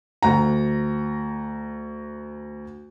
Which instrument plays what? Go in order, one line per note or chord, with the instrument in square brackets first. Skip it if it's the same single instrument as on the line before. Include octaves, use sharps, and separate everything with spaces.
[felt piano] D2 A#5